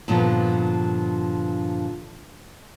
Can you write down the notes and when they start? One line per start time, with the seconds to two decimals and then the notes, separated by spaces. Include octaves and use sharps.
0.08 G2 A#2 D3 F3 B3